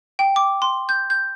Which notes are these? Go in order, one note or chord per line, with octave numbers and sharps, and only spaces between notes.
G5
D6
C6
G6
G6